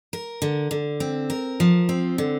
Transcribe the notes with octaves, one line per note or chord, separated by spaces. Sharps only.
A#4
D3
D3
C4
A#4
F3
C4
D3